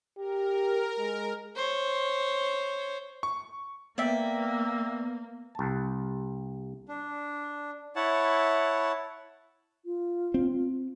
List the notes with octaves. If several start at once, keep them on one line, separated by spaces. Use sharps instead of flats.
G4 A#4
G#3
C5 C#5
C#6
A#3 B3 D5 E5 G5
C2 A5
D4
E4 C#5 F#5 A5
F4
C4